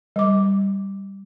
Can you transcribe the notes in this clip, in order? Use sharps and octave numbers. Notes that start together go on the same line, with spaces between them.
G3 D6